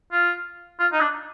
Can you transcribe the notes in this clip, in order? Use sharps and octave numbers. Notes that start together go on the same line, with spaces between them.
F4
F4
D#4
D4